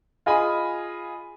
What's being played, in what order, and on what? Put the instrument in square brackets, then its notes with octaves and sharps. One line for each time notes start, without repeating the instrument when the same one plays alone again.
[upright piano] F4 G#4 D#5 G#5 B5